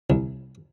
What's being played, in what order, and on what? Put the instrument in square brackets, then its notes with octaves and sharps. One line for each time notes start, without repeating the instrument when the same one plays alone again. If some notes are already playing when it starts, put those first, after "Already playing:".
[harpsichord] C2